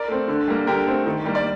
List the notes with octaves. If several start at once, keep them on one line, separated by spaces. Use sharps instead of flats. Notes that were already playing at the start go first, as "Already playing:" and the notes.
Already playing: A#4 D5
A3 C4
D3
G3 A#3
D3 G4 A#4
A3 C4
D#3
G3 A#3
D5